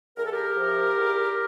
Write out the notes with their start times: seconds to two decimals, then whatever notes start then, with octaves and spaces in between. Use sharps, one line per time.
0.17 E2 A#4
0.25 A4
0.32 G4 A#4
0.56 C3 F3
0.96 E2